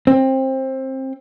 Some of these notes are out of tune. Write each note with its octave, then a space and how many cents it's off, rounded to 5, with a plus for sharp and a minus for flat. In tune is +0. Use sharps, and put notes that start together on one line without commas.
C4 +20